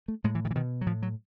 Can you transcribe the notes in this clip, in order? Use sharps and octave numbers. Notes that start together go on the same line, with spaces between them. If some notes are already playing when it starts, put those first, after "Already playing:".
A3
A2 G#3
E3
D#3
E3
B2 D#3
F#3
A2 F3
F#3